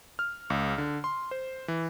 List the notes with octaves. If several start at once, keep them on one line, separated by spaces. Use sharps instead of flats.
F6
C#2
D3
C6
C5
E3